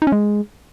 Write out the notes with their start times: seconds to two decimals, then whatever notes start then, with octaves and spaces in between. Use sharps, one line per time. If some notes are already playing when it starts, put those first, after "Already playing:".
0.02 D#4
0.07 C#4
0.12 G#3